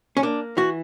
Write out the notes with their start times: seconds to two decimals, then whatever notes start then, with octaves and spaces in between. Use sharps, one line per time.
0.17 C#4
0.22 A#3 D4
0.57 E3 F#4